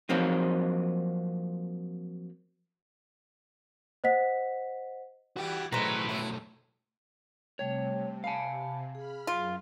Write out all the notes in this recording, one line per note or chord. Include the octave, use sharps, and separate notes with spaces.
F3 F#3 A#3 C4 D#4
C5 D#5 F#5 B6
E3 G3 B3 F#4 G4
B1 A2 F#3 G#3 A3 B4 C5 A#5
F#3 E4
C3 G3 A3 C#5 G5
F5 G#5 A5 B5
G#4 B5 F6
F#2 F4